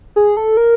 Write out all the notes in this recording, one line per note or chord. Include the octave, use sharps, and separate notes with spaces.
G#4
A4
A#4